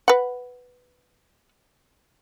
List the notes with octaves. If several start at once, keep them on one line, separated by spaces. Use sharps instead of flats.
B4 F#5